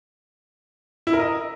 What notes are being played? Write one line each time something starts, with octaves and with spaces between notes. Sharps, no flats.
E4
A#4
D#5